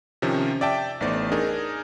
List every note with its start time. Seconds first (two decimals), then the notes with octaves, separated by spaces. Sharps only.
0.22 C3 D#3 F3 C#4
0.61 D5 E5 G5 A5
1.00 A1 A3 B3 D#4 C5 D5
1.32 D4 D#4 G#4 A#4